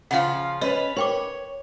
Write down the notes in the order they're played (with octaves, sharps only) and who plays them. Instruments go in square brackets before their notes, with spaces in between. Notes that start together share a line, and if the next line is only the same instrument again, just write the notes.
[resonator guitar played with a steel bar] C#3 F3 F4 [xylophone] F5 F#5
[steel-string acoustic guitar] C#4 [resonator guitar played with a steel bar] B4 [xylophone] D#5
[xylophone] A#4 G5 D6 [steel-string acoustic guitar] C#5